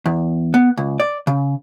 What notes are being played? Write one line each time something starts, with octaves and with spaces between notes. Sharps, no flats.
E2
B3
C#2
D5
C#3